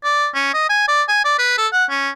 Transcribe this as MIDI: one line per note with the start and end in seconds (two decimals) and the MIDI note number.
0.04 0.27 74
0.35 0.49 61
0.54 0.64 75
0.69 0.86 80
0.88 1.03 74
1.09 1.21 80
1.25 1.34 74
1.39 1.56 71
1.58 1.67 69
1.73 1.85 78
1.90 2.10 61